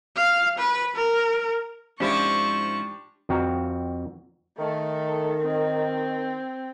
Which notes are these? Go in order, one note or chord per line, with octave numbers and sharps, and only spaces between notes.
F5
B4
A#4
G#2 F3 C#4 D4 E4 G4 C#6
F2 C4 F#4 F5 A#5
D#3 A3 A4
C4